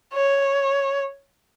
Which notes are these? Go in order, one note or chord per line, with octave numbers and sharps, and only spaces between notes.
C#5